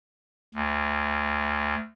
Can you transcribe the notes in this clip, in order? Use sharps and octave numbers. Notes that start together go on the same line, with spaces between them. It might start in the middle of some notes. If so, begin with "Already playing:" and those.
D2